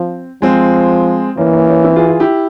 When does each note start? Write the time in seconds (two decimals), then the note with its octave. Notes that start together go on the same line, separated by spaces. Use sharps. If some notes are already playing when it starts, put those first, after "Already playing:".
Already playing: F3 C4
0.42 F3 G#3 C4
1.37 E3 A#3 C#4
1.53 A#3 C#4
1.68 A#3 C#4
1.84 C4 E4
1.96 F4 G#4
2.08 F4 G#4
2.20 E4 G4